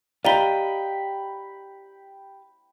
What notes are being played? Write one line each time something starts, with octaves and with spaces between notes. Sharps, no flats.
G4 D5 D#5 F5 G5 A#5 B5 G7